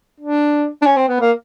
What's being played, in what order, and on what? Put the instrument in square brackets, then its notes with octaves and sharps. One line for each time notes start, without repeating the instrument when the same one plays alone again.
[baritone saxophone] D4
D4
C#4
C4
B3
A#3